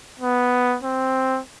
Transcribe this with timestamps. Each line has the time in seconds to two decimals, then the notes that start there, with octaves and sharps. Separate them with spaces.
0.20 B3
0.83 C4